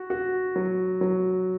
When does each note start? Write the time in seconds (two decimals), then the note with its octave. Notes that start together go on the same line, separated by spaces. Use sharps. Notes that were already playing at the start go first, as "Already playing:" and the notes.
Already playing: F#4
0.10 F#4
0.56 F#3
1.01 F#3